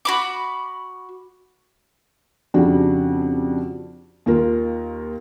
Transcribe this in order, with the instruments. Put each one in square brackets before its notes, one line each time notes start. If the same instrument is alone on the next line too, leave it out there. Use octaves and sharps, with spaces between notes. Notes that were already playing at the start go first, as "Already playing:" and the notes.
[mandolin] F#4 B5 D6
[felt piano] F2 C#3 D4 F#4 G4
D#2 F4 A#4